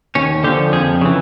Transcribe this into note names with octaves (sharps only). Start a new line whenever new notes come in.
D#2 C#4
D3 F3 G4
F2 G#4
C#3 E3